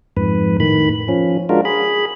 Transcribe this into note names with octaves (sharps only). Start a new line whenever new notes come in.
F2 G#2 B4
A2 D#3 B5
F3 C#4
G#3 D4 F4 F#4 A#4
G#4 B5